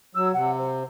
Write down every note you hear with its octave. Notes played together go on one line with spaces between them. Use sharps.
F#3 E6
C3 F#5
C5